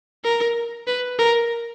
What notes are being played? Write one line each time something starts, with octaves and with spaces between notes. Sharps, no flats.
A#4
B4
A#4